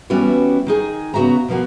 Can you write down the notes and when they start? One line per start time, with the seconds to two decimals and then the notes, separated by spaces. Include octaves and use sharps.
0.10 E3 G3 B3 C#4 E4 F#4
0.67 D#3 D#4 G#4
1.14 C#3 B3 F#4 E5 A#5
1.48 B2 F3 A#3 F#4